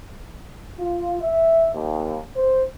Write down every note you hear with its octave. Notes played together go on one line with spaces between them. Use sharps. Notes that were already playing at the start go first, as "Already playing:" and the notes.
F4
E5
D#2
C5